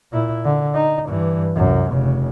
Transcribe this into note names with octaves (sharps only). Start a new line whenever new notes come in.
A#2 E4
D3
D#4
G2 E3
C2 F#2
F1 C#3